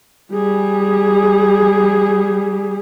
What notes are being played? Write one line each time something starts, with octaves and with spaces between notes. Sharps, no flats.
G3 G#4